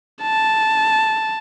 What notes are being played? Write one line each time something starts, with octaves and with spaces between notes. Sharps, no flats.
A5